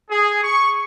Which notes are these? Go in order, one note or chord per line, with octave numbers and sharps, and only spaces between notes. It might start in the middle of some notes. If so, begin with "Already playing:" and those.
G#4
C#6